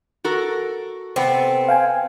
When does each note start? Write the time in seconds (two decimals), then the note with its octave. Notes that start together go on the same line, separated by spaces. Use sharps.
0.24 F#4 A4 A#4
1.16 C3 B3 C4 A4
1.68 F5 G5 G#5